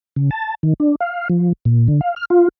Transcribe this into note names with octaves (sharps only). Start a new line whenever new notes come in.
C#3
A5
D#3
D4
F5
F3
A#2
D3
F5
F6
F4